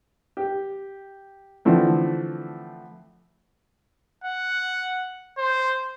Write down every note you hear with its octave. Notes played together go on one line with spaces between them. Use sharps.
G4
D3 E3 F3 A3 C4
F#5
C5